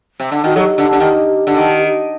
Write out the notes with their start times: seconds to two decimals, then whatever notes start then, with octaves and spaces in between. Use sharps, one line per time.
0.20 C3
0.32 D3
0.44 D#3 F#4
0.56 F#3 A4
0.59 G4
0.78 D3
0.93 D3
1.00 D#3
1.47 D3
1.57 D#3